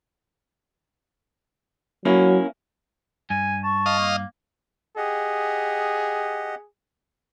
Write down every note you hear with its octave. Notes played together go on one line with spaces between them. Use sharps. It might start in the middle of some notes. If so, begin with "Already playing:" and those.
F#3 A#3 C#4 E4
G2 G#5
A5 C#6
D#5 F5
A#3
G4 G#4 D#5 F#5